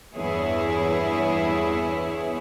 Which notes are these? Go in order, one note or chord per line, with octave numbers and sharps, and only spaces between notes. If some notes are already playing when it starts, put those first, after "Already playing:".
E2 G2 B3 E4 G#4 C#5